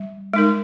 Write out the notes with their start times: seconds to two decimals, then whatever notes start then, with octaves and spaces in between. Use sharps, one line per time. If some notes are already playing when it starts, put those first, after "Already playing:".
Already playing: G3
0.34 G#3 D#4 A#4